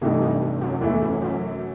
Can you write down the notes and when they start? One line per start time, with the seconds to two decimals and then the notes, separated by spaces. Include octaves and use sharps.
0.02 G2 C3 E3 A3 D#4
0.22 G2
0.42 G2
0.61 F#2
0.81 E2 E3 A3 E4
1.02 F#2
1.22 F#2